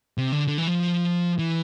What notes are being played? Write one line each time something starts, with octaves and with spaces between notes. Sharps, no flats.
C3
D3
D3
E3
F3
E3